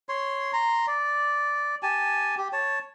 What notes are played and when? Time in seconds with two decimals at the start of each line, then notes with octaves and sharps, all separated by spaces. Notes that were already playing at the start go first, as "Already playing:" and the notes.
0.09 C#5 C6
0.53 A#5 C6
0.87 D5
1.83 G4 G#5 A5
2.37 G4
2.53 C#5 A5